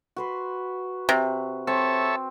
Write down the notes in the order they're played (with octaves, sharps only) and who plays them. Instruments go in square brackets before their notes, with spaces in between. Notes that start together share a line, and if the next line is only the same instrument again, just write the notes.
[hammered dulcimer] F#4 B4 C6
[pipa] C3
[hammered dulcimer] C4 [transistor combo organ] A4 C#5 E5